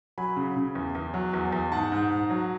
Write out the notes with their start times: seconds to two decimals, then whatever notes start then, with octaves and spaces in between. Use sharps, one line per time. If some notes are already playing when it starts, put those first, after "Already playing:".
0.18 F#3 G#5 B5
0.36 C#3
0.56 C#3
0.75 E2
0.95 E2
1.14 F#3
1.33 E2
1.52 E2
1.72 G#2 F#5 A5
1.92 G#2
2.10 G#2
2.30 F#3